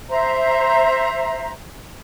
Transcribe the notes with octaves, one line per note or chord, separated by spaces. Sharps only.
C5 E5 A#5